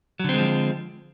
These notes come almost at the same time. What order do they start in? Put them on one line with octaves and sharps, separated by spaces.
F#3 D3 C4 G#3 F3